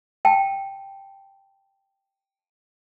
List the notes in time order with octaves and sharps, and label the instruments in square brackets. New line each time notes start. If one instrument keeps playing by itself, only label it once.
[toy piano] G5 A5